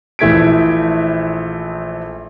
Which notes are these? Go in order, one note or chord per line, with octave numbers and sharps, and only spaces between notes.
A#1 E3 A3 G#6 B6 D7